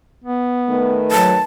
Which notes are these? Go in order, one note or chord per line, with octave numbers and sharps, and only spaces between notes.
B3
D#3 A3 B4
F#3 A5